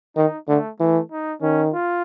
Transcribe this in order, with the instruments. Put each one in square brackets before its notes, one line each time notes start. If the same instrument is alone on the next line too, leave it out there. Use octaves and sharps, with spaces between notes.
[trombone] D#3 [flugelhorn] D#4
[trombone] D3 [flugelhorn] A3
[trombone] E3 [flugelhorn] A3
[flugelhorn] D#4
[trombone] D#3 [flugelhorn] C#4
[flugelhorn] F4